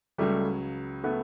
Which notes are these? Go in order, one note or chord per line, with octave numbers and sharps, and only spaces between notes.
C#2 C#3 F#3 G3 A3
A3 B3